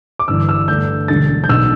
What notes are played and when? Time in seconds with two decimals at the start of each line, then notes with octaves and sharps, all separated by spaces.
0.19 D6
0.28 G1 G2 E3 E6
0.49 E6
0.68 G2 D3 A3 D4 G6
1.08 E1 D2 D3 G3 D4 A6
1.44 G6
1.49 B1 B2 B3 D4 E6